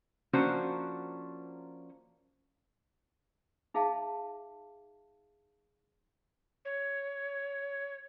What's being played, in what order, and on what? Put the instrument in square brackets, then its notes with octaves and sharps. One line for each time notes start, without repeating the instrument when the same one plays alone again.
[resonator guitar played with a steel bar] F3 A#3 C#4 D4 F#4 C5
[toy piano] D#4 G#4 E5 F5 A5
[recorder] C#5